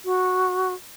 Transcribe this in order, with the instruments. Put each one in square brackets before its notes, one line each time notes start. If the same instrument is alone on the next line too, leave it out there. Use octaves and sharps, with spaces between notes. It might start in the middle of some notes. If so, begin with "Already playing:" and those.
[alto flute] F#4